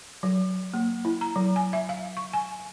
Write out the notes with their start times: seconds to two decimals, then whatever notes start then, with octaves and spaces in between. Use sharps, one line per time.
0.23 F#3
0.74 A#3
1.05 E4
1.21 A#5
1.36 F#3
1.56 G#5
1.73 E5
1.89 F5
2.17 C#6
2.33 G#5